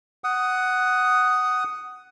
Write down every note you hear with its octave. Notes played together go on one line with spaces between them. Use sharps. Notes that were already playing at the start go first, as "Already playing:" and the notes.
F#5 D#6